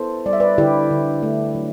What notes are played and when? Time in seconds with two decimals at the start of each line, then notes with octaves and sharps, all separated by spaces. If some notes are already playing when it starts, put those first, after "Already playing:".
Already playing: B3 E4 A4 C5
0.26 G3 D5
0.33 E5
0.40 B4 D5
0.58 D3 E4 G4
0.91 D3
1.23 A3
1.55 F#3